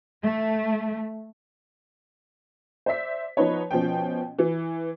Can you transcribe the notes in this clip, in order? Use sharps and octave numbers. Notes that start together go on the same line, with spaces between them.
A3
C5 D5 E5 B6
F3 B3 D#4 B4 C#5
B2 F3 C#4 G5
E3